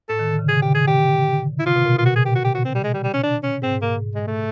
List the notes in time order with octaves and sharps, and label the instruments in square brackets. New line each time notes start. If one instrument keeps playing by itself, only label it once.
[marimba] A2 [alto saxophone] A4
[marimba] D#3
D3
C#3
[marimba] C3 [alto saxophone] G#4
[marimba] D3 [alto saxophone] G4
[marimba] D#3 [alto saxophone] G#4
[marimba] D3 [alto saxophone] G4
[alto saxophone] E4
[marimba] C3 [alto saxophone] F4
[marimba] B2
A#2
[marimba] B2 [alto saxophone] F4
[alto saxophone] F#4
G#4
G4
F#4
G4
F#4
C4
G3
G#3
G3
G3
C#4
D4
C#4
[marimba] G#2 [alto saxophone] C4
[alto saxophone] A#3
G#3
A3